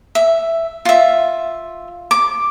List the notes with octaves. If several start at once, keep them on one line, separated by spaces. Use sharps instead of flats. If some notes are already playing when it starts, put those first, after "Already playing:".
E5
F4 E5
D6